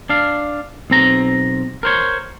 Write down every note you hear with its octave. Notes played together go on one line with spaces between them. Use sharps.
D4 F5
B1 C4 A#5
A#4 C5 C#5